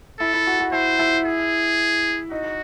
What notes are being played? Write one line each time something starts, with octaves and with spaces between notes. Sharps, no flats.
E4 A4
E4
F#4
F#4
E4 C5
E4
G#4
D#4 F#4